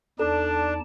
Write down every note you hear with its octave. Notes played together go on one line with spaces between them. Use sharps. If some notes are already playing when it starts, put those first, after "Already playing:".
E2 D4 D#4 A4 D5 A5